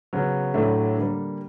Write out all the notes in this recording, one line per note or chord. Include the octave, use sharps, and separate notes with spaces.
C#3 F#3 B3
A2 F#3 A3 D4
D3 G3 A#3